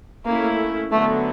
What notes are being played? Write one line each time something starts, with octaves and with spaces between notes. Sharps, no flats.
A3 A#3 C#4 E4
D3 F#3 A3 B3